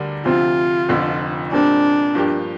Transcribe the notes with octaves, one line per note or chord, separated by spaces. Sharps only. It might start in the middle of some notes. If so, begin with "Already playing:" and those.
Already playing: D2 D3 G3 D4 A#4
D2 C3 F3 C4 F4
F1 F2 D3 F3
A#2 G3 C4 D4
G2 F3 A#3 G4